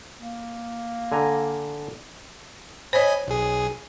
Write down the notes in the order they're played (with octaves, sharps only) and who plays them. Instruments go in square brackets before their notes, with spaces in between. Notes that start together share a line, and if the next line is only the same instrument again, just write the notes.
[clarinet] A#3
[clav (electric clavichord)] D3 G#5 A#5
[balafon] C5 C#5 [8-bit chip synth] D#5 G#5 B5
[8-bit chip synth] B1 G#4